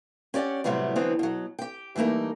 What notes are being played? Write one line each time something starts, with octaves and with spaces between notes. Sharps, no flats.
C#4 G4 D5 F#5
A2 C3 F#3 G3 A3 B3
D3 E3 F#3 B3 C4
B2 F#3
G4 G5
E3 G3 A3 A#3 D#4